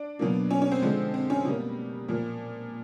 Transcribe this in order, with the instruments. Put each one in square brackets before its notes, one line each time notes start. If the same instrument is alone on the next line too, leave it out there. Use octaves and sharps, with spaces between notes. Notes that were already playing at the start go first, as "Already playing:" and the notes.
Already playing: [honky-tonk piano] D4
B2 F#3 A#3
C#4
C#4
C4
D3 F3 G#3
C4
C#4
B2 G3 A#3
A#2 F3 A#3